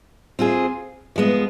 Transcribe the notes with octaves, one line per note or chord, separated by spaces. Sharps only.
C4 F4 G#4
F3 G#3 B3